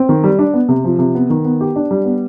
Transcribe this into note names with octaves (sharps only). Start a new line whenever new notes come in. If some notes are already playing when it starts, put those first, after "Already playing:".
Already playing: C4
D#3
G3
D4
B3
C3
F3
C3
B3
D#3
B3
G4
D4
G3
B3